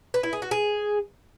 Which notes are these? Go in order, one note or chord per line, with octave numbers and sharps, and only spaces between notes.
B4
E4
G#4
F#4
G#4